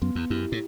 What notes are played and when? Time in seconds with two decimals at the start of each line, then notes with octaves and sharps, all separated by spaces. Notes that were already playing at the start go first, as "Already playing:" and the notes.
0.02 F#2 B3
0.15 E2
0.30 F#2 E4 G4
0.52 A2